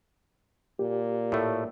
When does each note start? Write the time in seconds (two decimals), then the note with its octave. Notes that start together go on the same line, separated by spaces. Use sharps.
0.79 A#2 G4
1.32 A2 A3